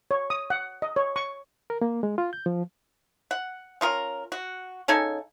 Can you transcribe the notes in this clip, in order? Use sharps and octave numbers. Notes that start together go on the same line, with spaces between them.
C#5
D#6
F#5
D#5
C#5
C#6
A#4
A#3
G#3
F4
G6
F3
F#5
C#4 F4 A#4
F#4
C#3 D#4 A4 G#5